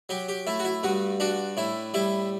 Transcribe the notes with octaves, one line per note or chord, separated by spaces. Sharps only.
F#3 G4
G4
A3 E4
F#4
E4
G2 F#4
D4 F#4
A2 E4
G3 E4